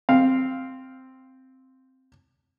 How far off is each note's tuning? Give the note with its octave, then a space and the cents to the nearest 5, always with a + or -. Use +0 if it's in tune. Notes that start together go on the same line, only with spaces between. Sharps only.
C4 +0 F5 +0